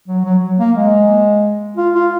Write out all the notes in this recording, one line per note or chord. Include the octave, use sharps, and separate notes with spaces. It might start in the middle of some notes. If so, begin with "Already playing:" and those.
F#3
F#3
A#3
G#3
F4
F4